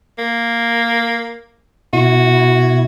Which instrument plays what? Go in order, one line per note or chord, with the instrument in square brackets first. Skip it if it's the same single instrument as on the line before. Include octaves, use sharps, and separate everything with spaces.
[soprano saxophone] A#3
[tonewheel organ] B2 E4 [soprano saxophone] F#4